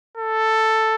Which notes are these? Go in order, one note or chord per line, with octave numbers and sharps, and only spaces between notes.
A4